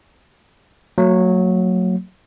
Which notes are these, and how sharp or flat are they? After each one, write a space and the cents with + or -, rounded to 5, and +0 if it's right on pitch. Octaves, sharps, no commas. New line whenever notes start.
F#3 -10 A3 +45